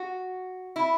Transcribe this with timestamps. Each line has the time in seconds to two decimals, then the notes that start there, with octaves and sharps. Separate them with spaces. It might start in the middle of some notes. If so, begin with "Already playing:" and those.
Already playing: F#4
0.76 E4